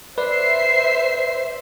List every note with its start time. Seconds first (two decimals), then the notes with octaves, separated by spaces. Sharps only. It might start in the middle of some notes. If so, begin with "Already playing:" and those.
0.18 B4 C5 D5 E5 C7